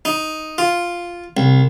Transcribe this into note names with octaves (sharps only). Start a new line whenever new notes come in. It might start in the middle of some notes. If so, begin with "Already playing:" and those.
D#4
F4
C2